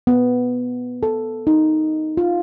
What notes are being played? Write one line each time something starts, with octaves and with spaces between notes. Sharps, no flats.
B3
A4
D#4
F4